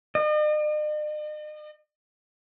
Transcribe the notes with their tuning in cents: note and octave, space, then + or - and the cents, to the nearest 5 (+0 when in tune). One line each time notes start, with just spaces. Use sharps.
D#5 -45